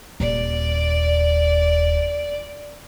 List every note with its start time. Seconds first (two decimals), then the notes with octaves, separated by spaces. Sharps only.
0.20 D#1 D5